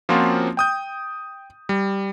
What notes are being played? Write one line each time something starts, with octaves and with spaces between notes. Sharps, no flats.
F3 A#3 C4 C#4 F4 F#4
G5 D#6 G6
G3